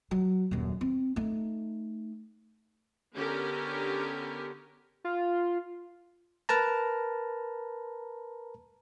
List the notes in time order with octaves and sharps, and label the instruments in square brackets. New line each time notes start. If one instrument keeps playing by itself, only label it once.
[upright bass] F#3
D#1 F#2
C4
A3 D#4
[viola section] D3 B3 C#4 G4 A4 A#4
[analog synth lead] F4
[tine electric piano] A#4 B4 A5 A#5